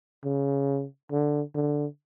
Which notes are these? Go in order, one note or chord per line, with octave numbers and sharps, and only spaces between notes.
C#3
D3
D3